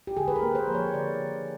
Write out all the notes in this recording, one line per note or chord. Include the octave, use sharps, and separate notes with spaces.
G4
D3 G#4
B4
A#4
A#3
C5
F3
C#5
D3 D5
D3